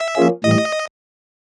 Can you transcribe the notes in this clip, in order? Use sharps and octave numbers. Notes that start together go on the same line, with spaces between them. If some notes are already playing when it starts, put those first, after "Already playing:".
Already playing: E5
F3 A#3 C#4 F4 G#4
A2 E3 G3 D#5